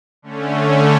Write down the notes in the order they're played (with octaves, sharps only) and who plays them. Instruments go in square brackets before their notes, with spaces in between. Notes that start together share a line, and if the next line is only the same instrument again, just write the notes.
[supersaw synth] D3 A3 C#4